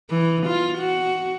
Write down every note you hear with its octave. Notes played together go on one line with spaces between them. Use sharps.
E3
F4
F#4